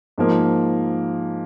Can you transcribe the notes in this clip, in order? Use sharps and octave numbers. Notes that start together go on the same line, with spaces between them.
G#2 F3 A#3